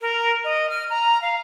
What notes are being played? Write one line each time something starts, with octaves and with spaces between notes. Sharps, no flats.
A#4
D#5
F6
A#5
F5